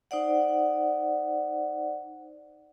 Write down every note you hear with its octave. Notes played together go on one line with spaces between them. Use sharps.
D#4 C5 D5 F#5